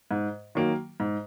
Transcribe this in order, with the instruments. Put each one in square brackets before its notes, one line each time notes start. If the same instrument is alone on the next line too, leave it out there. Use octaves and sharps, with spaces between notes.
[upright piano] G#2
D#3 F#3 A#3
G#2